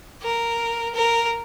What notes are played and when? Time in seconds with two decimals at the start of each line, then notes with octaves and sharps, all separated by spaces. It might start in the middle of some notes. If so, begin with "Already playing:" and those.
0.23 A#4
0.95 A#4